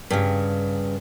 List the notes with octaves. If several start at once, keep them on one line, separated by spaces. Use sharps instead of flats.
G2 C#3